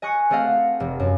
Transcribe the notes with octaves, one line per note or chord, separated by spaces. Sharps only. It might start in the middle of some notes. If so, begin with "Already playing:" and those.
D#5 G#5 C#6 F#6 C#7
A3 C4 A4 D#5 F5 F#5
F1
F#2